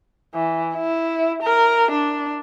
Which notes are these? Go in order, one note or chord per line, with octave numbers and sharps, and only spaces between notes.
E3
E4
A#4
D4